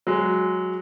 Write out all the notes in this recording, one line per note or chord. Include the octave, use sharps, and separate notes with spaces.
F#3 G#3